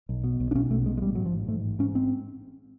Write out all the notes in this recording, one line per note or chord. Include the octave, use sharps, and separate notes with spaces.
B1
B2
B1
D4
B2 C#4
B1 A3
B2 G#3
G#3
A1 G3
G#2 F#3
F3
A1
G#2 A3
A1
G#2 C#4
C4